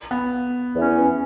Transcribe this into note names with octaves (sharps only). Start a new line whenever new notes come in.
B3
E2 E3 C#4